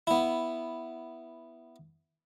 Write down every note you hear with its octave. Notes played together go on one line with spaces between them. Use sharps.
B3 E4